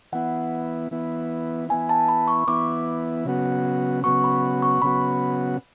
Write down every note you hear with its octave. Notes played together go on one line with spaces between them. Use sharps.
E3 B3 E4 F#5
E3 B3 E4
E3 B3 E4 G#5
A5
B5
C#6
E3 B3 E4 D6
C#3 F#3 B3 F#4
C#3 F#3 B3 F#4 C#6
B5
C#6
C#3 F#3 B3 F#4 B5